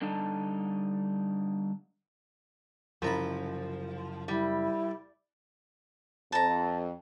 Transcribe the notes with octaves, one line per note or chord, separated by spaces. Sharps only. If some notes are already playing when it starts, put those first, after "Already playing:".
D3 G3 D4 D#4 A4 A5
C2 F#2 C#3 F3 A#5 B5
G3 E4
F2 A5 A#5